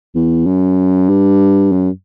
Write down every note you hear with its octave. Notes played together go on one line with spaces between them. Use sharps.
E2
F#2
G2
F#2